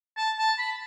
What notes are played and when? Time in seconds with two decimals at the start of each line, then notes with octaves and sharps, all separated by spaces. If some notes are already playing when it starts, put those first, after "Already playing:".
0.17 A5
0.38 A5
0.58 B5